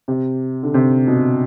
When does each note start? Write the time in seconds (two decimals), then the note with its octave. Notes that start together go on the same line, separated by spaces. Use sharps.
0.08 C3
0.63 D3
0.74 C3
1.07 B2